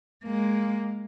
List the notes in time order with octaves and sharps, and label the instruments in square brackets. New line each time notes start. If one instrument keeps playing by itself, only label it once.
[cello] G#3 A#3